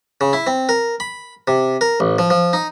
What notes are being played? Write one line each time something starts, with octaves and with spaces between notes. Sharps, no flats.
C#3
E4
C4
A#4
B5
C3
A#4
A1
F3
F3
D#4